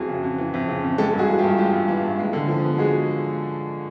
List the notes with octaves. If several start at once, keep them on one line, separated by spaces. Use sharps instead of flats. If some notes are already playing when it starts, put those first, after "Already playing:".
Already playing: F2 E3 F#4 G#4
C#3
F2
E3
F2
C#3
F2
G#3 G4 A4
G2
F#4 G#4
E3
F4 G4
G2
G#3 F4 G4
G2
E3
G2
G#3
D3
F3
B3
G#3 F#4 G#4